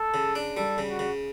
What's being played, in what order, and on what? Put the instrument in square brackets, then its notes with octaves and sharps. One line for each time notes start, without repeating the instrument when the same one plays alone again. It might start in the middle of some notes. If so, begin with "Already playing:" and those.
Already playing: [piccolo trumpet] A4
[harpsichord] C#3
D4
[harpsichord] G3 [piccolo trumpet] A4
[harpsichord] C#3
[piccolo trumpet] F#4
[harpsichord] C#3